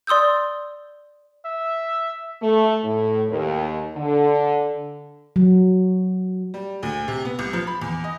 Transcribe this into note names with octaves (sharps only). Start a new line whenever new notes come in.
D5 C6 D#6 E6 G6
E5
A3
A2
D#2
D3
F#3
G3
D2
C3
B3
C2
F3
B5
E2
D#5